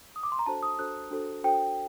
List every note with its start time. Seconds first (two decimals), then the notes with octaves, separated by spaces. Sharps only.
0.16 D#6
0.23 D6
0.32 C6
0.39 A#5
0.46 D4 F#4 A4 C5 A5
0.63 D#6
0.79 D4 F#4 A4 C5 F#6
1.11 D4 F#4 A4 C5
1.44 D4 F#4 A4 C5 G5